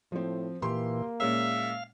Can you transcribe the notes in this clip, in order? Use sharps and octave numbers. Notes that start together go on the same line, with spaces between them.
A2 F3 C4
A#2 E3 A#3 G4 C6
A#2 G#3 C#4 E5 F5